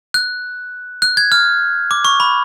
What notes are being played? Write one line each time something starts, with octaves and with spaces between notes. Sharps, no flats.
F#6
F#6
G#6
F6
D6
C#6
B5